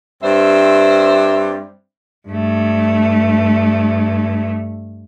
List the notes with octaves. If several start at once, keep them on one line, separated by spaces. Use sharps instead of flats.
G2 G3 C4 C5 E5
G2 A3